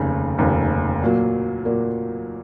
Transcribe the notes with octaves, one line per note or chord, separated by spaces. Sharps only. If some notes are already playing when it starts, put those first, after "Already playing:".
Already playing: F1 D#2 C#3
F1 D#2 C#3
A#2 F#3 A#3
A#2 F#3 A#3